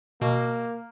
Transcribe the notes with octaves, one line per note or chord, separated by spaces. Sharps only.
B2 A#3